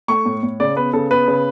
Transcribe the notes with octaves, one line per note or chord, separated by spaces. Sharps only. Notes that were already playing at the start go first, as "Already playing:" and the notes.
A3 C#6
A2
A2
C#3 D5
B3 B4
C#3 A4
B3 B4
C#3